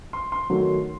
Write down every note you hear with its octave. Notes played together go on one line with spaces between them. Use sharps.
C6
C6
D#3 F#3 A3